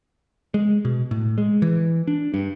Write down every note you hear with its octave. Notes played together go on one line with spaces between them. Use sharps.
G#3
B2
A2
G#3
E3
D4
G2